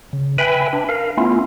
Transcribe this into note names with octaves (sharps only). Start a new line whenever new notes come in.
C#3
B4 E5 G5 G#5 B5
D4
A#4 F5
A3 B3 C#4 E4 F4